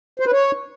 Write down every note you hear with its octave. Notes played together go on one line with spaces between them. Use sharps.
C5
B4
C#5